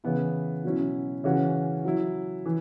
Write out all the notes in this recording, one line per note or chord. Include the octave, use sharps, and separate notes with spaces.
C#3 E3 B3 E4
B2 F#3 C#4 E4
C#3 E3 C#4 F#4
F#3 E4
E3